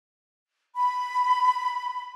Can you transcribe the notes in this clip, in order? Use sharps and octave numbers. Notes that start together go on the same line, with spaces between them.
B5